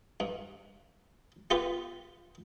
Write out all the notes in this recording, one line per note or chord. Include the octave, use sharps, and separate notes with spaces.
G2
B3 F4 G4 B4